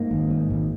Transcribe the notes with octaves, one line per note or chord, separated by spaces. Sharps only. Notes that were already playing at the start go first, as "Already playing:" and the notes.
Already playing: G#2 A#3
G#1
G#2
G#1